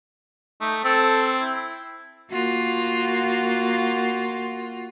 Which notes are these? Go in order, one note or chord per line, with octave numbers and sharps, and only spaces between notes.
A3 D#4
C4 A4
E4
A#3 F4 F#4